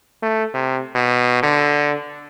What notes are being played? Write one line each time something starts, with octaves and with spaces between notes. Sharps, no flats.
A3
C3
B2
D3